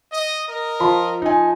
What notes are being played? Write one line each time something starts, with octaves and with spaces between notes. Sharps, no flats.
D#5
A#4 D#5
F3 B5 C6
D#4 G#5